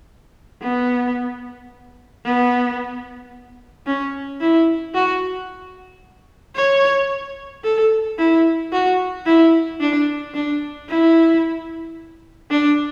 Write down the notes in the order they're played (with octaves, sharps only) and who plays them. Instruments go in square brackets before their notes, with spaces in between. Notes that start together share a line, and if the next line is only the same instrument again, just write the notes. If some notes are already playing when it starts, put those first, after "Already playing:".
[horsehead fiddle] B3
B3
C#4
E4
F#4
C#5
A4
E4
F#4
E4
D4
D4
E4
D4